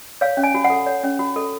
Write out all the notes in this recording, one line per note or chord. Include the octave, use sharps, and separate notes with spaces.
C#5 F5
C#4
G#5
F#4
F#5
A4
C#5
C#4
F#4
A4